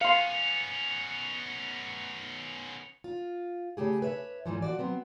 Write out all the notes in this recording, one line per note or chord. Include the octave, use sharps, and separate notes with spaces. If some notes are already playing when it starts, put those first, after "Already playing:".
B3 C#4 F5 C6 C#7 F7
F4
C#3 A3 G4 G#4
B4 C#5 E5
G#2 B2 E3 F3
F3 F#4 D5
F#3 B3 C4